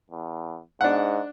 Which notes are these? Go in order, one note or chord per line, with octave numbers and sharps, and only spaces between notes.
E2
G#2 D4 F#5